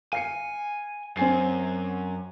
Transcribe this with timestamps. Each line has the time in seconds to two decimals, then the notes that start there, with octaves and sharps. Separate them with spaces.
0.13 F5 G#5 C7 C#7
1.17 F#2 C4 G#5 C7